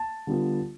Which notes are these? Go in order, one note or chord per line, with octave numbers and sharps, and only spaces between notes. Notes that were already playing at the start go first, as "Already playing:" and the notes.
Already playing: A5
D3 G3 B3 F4